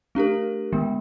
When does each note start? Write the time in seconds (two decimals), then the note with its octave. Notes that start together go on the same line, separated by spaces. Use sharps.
0.15 A3 D4 G4 A#4
0.72 D#3 G#3 B3